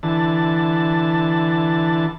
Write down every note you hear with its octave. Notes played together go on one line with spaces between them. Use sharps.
D3 E3 A5